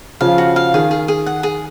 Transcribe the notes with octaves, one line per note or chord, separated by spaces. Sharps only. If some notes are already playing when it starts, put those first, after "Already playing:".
C#3 F3 F5
F#4
F5
D#3 G#4
G#4
G#4
F#5
G#4